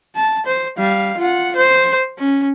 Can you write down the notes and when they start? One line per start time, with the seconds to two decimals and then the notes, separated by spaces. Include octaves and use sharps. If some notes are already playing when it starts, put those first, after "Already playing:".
0.15 A5
0.46 C5
0.77 G3 F5
1.18 F4 F#5
1.56 C5
2.18 C#4